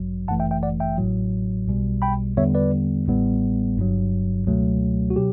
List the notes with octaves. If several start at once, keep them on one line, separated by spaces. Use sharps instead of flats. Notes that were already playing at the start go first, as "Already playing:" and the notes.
Already playing: A1 G2 F#3
G1 F#2 E3 A3 F#5 A5
E5 G5
E5 G5
D5 F#5
E5 G5
A1 A2 F#3
B1 B2 G3
G5 B5
E2 D3 G3 B3 C#5 E5
B4 D5
A1 A2 G3 B3
G1 G2 F#3
C#2 B2 F#3 A3
F#4
B2 F#3 G4